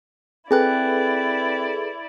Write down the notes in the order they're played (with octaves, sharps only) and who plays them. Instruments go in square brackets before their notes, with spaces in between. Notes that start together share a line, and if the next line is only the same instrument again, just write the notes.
[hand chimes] C4 G5 F#6 [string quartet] E4 D5 [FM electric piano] G#4 A4 B4